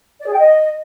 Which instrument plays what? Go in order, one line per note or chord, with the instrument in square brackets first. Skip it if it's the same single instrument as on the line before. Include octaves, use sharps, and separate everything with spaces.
[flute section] D5
G#4
G5
D#5